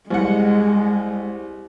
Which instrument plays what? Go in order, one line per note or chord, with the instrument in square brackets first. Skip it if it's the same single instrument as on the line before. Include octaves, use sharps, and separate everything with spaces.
[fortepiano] C2 F#5 [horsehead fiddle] G#3